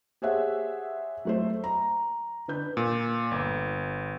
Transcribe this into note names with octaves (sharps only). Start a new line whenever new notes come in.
G4 G#4 C5 C#5 E5 F#5
F#3 A3 C5
A#5
D3 B4 G6
A#2
G1